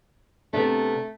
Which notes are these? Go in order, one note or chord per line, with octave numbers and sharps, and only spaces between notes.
C3 A3 B3 D4